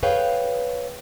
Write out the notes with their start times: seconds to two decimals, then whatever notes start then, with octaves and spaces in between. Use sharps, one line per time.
0.03 G#4 B4 C#5 F5 G5